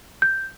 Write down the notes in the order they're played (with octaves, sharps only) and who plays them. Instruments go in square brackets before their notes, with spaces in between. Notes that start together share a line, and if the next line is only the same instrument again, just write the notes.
[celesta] G6